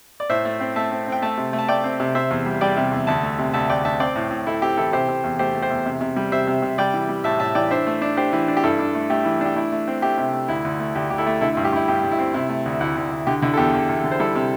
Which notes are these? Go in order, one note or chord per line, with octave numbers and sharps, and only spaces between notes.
D5
A2 C5 E5
A3
C4
A3 E5 A5
C4
C4 G5
A3 E5 A5
C3
A3
A5
A3 D5 G5
C4
C3
C3 C5 E5
E2
G3
G3 D5 G5
C3
E2
D2 E5 A5
A3
C3
D2 E5 A5
D2 D5 G5
D2 E5 A5
C4 D5 G5
A2
A2
A2 E4 A4
C4 G4
E3 E4 A4
C3 G4 C5
C3
E2
A3 G4 C5
A3
G4 C5
E2
C3
C3
G3
C3 C5 E5
C3
C3
G3 D5 G5
E3
G3
A2 E5 A5
A2 E5 A5
E3 D5 G5
D4 C5 E5
A3
D4
D4 G4 C5
E3
D4
G4
G2 E4 A4
D4
A3
A3 G4
E3
D4 G4
A3 E4
A3
C4
A3 G4
C3
A3
D2 E4
D2
A3
D2 G4
D2 G4
E4 A4
A3
D3 E4 A4
E4
G2
G4
G2 E4
G2 G4
G2
E4
C4
C3 E4
A3
D2
D2 E4
D2
D2
D3 G4
D3 E4
A4
E2 G4
E2
E2
D3
C5
G3 E4 A4
C3